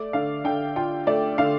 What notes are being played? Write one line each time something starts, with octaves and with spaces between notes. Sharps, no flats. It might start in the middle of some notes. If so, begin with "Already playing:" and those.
Already playing: A3 D5
D3 F5
D3 G5
F4 G5
A3 D5
D3 F5